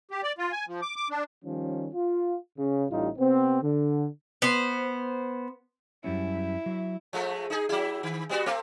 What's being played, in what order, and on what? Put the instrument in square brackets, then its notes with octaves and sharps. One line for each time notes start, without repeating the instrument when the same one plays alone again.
[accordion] G4
D5
F4
G#5
F3
D6
D6
D4
[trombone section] D#3 F3 G3 C#4
F4
C#3
A1 A2 G3 D#4 F4
C3 B3 C4
D3
[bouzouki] B3 C5
[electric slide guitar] F#2 G3 C#4 [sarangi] E4
[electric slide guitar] F#3 E5
[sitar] F3 G#3 A3
D#4 G#4
F#3 E4
D#3
G3 B3 F#4
A3 C4